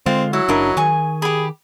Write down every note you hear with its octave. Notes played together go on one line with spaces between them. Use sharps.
D3 G#3 C4 F4
F#3 E4
F#1 F#2 D4 E4 A#4 D#5
D#3 G#4 G#5 C#6
G4 G#4 B5